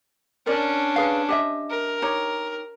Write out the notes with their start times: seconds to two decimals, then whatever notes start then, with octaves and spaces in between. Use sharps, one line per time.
0.46 C#4 D4 A#4 D5
0.96 G#4 B4 F5
1.29 G4 D#5 E5
1.70 A#4
2.02 D#4 G4 C#5